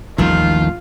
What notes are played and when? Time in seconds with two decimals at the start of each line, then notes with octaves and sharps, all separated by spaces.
0.18 A1 D#2 D#3 F3 G3 F4 A#4